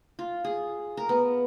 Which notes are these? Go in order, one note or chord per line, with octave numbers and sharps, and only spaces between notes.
F4
G#4
A#4
B3